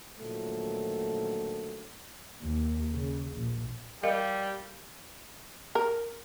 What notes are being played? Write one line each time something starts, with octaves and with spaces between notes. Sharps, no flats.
A#2 D3 D#3 F3 F#3 A3
D#2
C#3
A#1
G3 A#4 D#5 F5
A#4